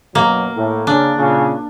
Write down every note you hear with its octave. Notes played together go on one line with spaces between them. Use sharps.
F#2 B2 F#3 A#3
A2
C#3 D4
A#2 C#3